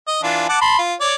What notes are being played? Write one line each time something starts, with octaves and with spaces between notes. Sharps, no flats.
D#5
E3 D4 F4
F#5 A5 D6
A5 B5 C6
F4
C#5 D5